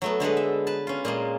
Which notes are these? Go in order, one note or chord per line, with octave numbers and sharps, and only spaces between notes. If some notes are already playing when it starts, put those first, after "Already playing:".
F#3 A3 B3
D3 G#3 A4 B4
E5
B4 A5
C#4 F4
A#2 G#3 A#3